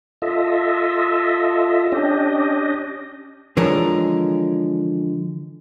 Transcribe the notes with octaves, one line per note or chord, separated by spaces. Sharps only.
F4 A4 D#5 E5
C#4 D4 G4 D#5
D3 E3 F3 G#3 A#4 C#5